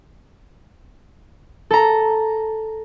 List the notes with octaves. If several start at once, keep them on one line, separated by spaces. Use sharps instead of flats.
A4 A#5